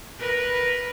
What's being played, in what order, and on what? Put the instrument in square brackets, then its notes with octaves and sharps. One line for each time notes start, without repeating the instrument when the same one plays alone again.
[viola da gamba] A#4 B4